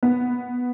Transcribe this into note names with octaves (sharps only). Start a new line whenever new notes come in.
B3